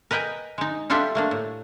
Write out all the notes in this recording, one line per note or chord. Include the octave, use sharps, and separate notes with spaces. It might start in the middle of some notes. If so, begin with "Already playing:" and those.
A#4 B4 D#5 G5 G#5
G#3 D#4
G3 D4 F4 G4 A4 E5
A3 A#3 D4
A2